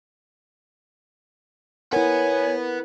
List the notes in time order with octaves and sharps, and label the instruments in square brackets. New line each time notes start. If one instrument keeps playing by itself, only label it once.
[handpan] E4 A#4 [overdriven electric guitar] B4 F#5 [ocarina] C#5 [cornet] G#5